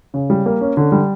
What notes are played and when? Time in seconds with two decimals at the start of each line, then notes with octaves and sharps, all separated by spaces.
0.14 C#3
0.30 G3
0.46 A#3
0.61 C#4
0.77 D3
0.92 G3